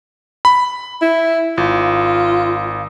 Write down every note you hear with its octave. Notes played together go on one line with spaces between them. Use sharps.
B5
E4
G#1 F4